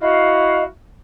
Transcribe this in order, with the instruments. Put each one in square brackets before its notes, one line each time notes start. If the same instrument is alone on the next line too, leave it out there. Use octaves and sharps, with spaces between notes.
[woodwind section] E4 F#4 F5 [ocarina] D#5